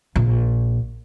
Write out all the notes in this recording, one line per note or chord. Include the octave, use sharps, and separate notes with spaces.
A#1